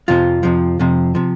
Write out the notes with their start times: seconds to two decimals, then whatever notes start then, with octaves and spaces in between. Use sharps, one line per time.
0.08 F2 C3 F3 F4
0.43 F2 C3 F3
0.79 F2 C3 F3
1.15 C3 F3